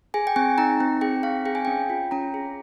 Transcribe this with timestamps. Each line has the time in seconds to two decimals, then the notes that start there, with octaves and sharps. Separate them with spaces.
0.14 G#4 G#5
0.27 G5
0.36 C4 G#5
0.58 D#4 A#5
0.80 C4
1.01 G#4 G5
1.23 C4 F5
1.45 G#4 G5
1.55 G#5
1.65 C#4 G5
1.90 F4
2.11 C#4 A#5
2.34 G#4